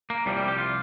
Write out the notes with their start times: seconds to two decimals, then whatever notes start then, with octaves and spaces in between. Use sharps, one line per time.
0.10 A#3
0.26 C2 C3 F3 G3
0.37 G3
0.48 G4
0.59 F4